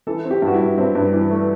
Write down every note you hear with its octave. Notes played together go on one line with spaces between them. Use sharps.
E3 A4
C4
G4
G2 F#4
E4
G2
G2 C4
G2
E3
A3